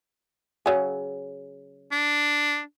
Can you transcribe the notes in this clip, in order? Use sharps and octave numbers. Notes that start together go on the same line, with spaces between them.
C#3 F#3 G#4
D4